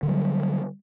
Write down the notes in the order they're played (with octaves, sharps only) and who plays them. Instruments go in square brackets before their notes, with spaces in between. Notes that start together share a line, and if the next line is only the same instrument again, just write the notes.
[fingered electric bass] D3
D#3
F#3
G3